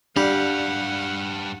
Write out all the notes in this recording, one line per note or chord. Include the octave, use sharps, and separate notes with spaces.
G2 G3 D4 F5 F#5